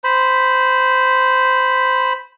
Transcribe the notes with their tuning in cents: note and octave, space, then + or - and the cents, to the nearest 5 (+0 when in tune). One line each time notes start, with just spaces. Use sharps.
C5 -10 B5 +0